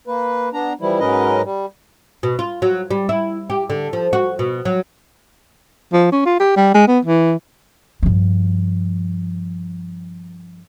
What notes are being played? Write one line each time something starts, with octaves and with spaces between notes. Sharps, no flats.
A#3 B4
B3 D4 A#5
E3 F3 G3 E4
G#2 F#3 C#4 A#4 B4 D#5
G3
B2
F4
F#3
G3
E4
G4
D3
F3
F#4
B2
F#3
F3
C#4
F4
G4
G3
G#3
B3
E3
G2 F3